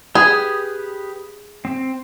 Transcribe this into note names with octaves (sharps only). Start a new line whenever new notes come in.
G4 G#4 B4 D#6
C4